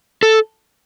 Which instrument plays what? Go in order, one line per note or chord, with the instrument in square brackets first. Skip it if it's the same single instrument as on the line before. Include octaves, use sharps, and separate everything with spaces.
[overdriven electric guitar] A4